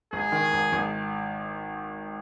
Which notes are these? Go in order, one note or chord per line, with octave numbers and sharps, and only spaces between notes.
G#1 G#4
D#3
G#1
G#1